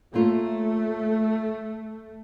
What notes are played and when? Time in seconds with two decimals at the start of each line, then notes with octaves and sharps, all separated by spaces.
0.14 A3 A#3 C#4 F4